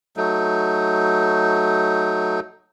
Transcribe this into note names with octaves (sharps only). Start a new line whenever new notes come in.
F#3 A3 D#4